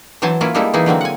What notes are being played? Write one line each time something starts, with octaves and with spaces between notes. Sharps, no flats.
E3 F#3 C5 G#5 A5
A#3 C#4 E4 F4
G3 G#3 A#3 E4 G4 A4
E3 A#3 D#4 E4 G#4
D3 F#3 A#3 C4
F#5 G#5